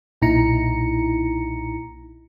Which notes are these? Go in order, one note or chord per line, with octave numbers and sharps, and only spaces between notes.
B1 A#2 D#4 E4 A#5 C#7